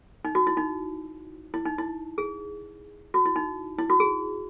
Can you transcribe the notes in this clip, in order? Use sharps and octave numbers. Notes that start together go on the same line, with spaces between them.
D#4
F#4
E4
D#4
E4
D#4
E4
G#4
F#4
E4
D#4
E4
F#4
G#4